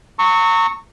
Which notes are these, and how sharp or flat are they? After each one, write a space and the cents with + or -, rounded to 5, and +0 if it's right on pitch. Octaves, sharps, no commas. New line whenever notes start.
A#5 -35 C#6 +0 E6 -35